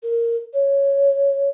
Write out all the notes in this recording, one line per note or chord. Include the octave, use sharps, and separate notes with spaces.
A#4
C#5